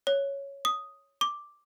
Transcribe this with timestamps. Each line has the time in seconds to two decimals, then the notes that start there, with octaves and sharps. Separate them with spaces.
0.07 C#5
0.65 D#6
1.21 D6